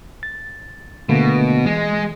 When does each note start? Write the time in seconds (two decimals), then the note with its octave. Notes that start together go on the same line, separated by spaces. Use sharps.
0.23 A6
1.09 B2 D3 A3 A#3
1.66 E3 G#3